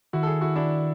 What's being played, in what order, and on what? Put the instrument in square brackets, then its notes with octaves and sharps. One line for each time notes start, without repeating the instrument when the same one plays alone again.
[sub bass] D#3 [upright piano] E4 F#4
[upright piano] A4
F#4 G#4
E4 F#4
D4 E4